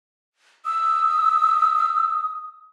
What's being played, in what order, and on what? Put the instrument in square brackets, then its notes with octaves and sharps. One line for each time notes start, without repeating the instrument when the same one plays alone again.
[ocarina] D#6 [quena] E6